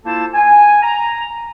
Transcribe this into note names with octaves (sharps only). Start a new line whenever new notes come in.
A#3 E4 F4 A4 C5 A5
G#5
A#5